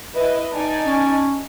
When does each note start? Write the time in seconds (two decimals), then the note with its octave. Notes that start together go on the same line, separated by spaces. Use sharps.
0.14 E4 B4 D#5
0.54 D#4 D5 G#5 A5
0.86 C#4